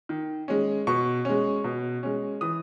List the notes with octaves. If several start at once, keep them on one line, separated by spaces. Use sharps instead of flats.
D#3
G#3 C#4
B2 C#6
G#3 C#4
B2
G#3 C#4
E3 D#6